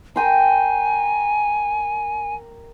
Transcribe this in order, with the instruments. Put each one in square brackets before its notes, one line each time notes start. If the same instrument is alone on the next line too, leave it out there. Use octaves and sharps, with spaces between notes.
[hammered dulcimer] A#4 G5 C6 [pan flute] G#5